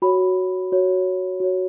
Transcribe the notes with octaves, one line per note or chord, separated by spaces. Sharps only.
F#4 C#5 B5
F#4 C#5
F#4 C#5